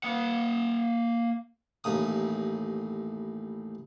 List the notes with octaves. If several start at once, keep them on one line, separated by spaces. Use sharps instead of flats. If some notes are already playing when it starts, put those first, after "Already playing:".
A#3 F#5
A1 D#2 A2 D#6